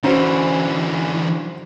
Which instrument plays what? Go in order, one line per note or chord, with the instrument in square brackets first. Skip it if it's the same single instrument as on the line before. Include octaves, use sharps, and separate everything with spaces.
[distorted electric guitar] D3 E3 [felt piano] C#4 F#4 C5